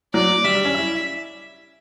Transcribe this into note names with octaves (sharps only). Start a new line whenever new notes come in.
F#3 D5
G3 E5
G3
C#4
E4